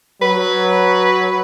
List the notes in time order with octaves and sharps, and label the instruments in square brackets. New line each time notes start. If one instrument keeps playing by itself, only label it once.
[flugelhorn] F#3 [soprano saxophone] B4